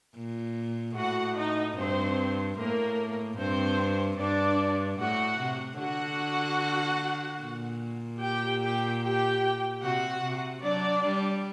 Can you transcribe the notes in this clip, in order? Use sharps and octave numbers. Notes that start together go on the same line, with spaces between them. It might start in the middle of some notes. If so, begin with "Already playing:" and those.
A#2
A2 F#4 F#5
D#4 D#5
G2 C4 C5
A2 A#3 A#4
G2 C4 C5
G2 D4 D5
A2 F#4 F#5
C3
D3 F#4 F#5
A#2
G4 G5
G4 G5
G4 G5
C3 F#4 F#5
C3
F#3 D4 D5
G3